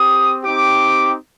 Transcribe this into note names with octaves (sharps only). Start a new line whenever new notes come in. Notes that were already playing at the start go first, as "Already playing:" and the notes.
Already playing: C4 G4 D#6
C4 D#4 G4 D6